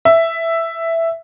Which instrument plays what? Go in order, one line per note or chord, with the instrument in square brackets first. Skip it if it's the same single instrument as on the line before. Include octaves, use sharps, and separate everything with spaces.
[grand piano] E5